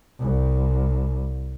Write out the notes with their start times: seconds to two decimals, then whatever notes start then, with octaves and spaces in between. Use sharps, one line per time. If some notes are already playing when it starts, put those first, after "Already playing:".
0.19 C2